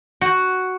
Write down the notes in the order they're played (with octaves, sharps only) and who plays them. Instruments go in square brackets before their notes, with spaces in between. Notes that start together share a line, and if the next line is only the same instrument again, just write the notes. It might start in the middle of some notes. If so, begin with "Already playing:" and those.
[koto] F#4